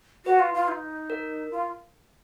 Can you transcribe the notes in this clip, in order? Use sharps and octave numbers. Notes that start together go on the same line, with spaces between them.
F#4 B4
F4
F4
D#4
A#4
F4